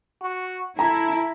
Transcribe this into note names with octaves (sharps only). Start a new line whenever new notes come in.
F#4
E4 A4 A#5